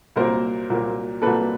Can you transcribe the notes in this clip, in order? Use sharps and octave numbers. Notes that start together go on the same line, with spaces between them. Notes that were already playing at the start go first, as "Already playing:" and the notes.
C2 A#2 F#3 A#3 A#4 C5
C2 A#2 F#3 A#3
C2 A#2 F#3 A#3 A4 B4